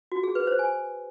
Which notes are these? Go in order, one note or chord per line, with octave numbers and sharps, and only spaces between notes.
F#4
G#4
B4
C5
G#5